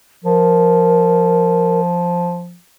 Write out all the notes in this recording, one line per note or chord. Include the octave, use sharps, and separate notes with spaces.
F3 A#4